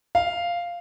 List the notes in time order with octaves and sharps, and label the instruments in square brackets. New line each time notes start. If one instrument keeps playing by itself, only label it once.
[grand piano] F5